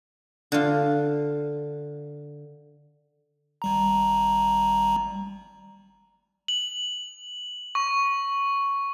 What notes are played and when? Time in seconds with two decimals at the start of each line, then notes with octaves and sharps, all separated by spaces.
0.52 D3 F4
3.62 G#1 G3 A#5
6.48 F#7
7.75 C#6